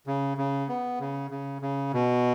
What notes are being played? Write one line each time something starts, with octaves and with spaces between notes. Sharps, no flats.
C#3
C#3
B3
C#3
C#3
C#3
B2